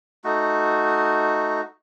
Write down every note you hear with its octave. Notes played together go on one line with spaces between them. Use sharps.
A3 D#4 F#4